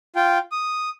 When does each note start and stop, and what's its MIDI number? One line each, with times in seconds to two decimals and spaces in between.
0.16 0.38 65
0.16 0.38 79
0.52 0.89 87